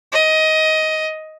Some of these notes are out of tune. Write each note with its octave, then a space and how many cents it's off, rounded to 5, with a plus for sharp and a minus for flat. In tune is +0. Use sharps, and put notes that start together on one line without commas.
D#5 +15